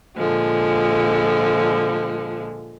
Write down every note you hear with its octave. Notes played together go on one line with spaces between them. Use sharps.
A#2 D3 F3 G#3